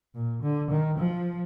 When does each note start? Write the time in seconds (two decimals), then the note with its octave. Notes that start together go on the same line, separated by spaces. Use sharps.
0.15 A#2
0.42 D3
0.71 D#3
0.98 F3